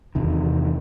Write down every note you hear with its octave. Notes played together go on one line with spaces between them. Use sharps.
E2 C3 D#3